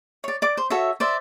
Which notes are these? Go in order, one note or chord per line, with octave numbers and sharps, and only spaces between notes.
C#5 D5
D5 D6
C5
F#4 A4 C#5 E5
C5 D5 E5